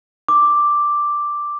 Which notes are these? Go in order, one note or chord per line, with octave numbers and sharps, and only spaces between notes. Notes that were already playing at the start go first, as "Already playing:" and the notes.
D6